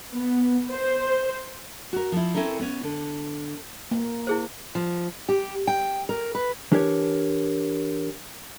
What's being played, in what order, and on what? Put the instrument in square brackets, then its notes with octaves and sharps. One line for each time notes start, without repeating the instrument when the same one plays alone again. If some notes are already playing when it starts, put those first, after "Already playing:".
[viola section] B3
C5
[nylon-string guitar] F#4 A#4
F3 E4
C4 C#4 E4 A4 A#4
B3 C#4
D3
[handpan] A#3
[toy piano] E4 G#4 C5
[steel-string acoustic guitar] F3
G4
G5
A#4
B4
[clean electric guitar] E3 D4 G4 A#4 C#5